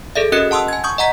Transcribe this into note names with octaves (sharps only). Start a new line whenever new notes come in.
G#4 A4 D5 E5
C#4 F#4 A#4 D#5 F#6 C#7
F#5 A5 C6 D#6 E6
G#5 G#6
C#6 D#6 G6
D#5 F#5 A#5 B6